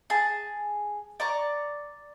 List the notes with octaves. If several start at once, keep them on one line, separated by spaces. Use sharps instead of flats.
G#4 A5
D5 A#5 C#6